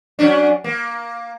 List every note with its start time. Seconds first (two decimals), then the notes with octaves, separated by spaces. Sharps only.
0.19 F#3 C#4 D4
0.64 A#3